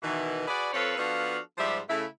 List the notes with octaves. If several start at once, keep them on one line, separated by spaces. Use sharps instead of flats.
B2 D#3 E3
F#4 G#4 B4 D5
F2 C4 A4 B4 C#5 F5
F3 B3 D4 F#4 A4 F5
G#2 F3 G3 G4 C5 E5
C#3 A3 E4